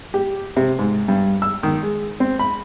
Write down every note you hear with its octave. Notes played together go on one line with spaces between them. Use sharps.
G4
C3
G#2
G2
E6
D#3
G#3
C4
B5